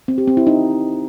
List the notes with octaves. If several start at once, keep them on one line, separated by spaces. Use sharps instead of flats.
C4
G4
C4
E4
D#4